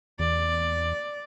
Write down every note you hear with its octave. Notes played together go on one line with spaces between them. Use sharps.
E2 D5